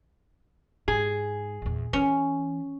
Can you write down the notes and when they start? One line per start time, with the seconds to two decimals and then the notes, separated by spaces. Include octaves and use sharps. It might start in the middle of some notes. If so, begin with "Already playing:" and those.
0.88 G#2 G#4
1.62 A#1 E2
1.93 E3 C#4